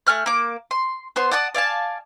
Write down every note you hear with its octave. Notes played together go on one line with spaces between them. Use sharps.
A3 G#5 F6 F#6
A#3 D6
C6
B3 C5 C6
D5 F#5 A5 D#6
D5 F5 G#5 A5